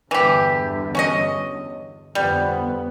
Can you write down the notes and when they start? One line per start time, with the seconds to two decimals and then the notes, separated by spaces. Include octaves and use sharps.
0.11 E2 G2 D3 E3 G4
0.95 C#4 F#4 D#5
2.15 G1 F2 G3 B3